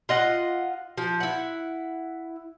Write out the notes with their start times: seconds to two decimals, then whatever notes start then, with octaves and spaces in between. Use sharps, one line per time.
0.09 F4 D#5 F#5
0.98 F3
1.20 E4 F#5